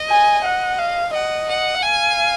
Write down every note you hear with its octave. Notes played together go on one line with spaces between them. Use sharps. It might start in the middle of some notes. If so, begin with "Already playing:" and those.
Already playing: D#5
G#5
F#5
F5
D#5 F#5
F#5
F5 G#5